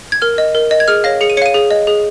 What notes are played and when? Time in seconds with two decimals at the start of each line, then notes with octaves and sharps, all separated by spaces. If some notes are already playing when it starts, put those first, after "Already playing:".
0.12 G#6
0.22 A#4 F6
0.38 D#5
0.55 A#4
0.71 D#5
0.80 G#6
0.88 G#4 F6
1.04 C#5 F5 A#6
1.21 G#4 C#7
1.30 D#7
1.37 C#5 C#7
1.42 F5 D#7
1.54 G#4
1.71 D#5
1.87 G#4